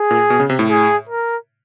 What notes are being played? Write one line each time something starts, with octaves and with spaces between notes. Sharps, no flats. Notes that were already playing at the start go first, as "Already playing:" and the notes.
Already playing: G#4
A#2
B2
C#3
C3
A2
G#4
A#4